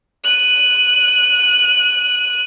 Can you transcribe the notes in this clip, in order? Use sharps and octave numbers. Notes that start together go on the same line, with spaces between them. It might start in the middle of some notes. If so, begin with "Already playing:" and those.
F#6 D#7